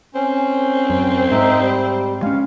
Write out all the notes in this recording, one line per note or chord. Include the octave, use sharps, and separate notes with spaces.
C4 C#4
F#2
G#2 D#4 E5
G3
G#3 C#4 F5